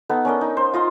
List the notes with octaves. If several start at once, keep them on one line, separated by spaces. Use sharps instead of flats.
B3 D#4 A4
C#4 D4 A#4 D#5
D#4
C5
F4 D#5 F5 C6